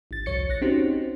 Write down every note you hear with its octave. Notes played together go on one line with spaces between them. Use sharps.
G#1 A6
C2 F2 C#5 A6 C#7
A#1 F#6 A#6
C4 C#4 D#4 F#4 G4 C5